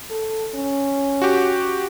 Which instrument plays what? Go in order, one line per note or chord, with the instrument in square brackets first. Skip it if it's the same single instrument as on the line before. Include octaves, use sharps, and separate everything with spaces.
[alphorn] A4
C#4
[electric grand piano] F#4 G4